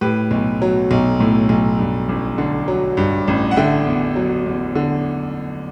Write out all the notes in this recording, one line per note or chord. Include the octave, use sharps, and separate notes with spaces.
A2 G4 B4
B1
F#3
B1
A2
B1
G2
A1
D3
F#3
G2
A1
F#5
D3 E5 G5
E2
F#3
E2
D3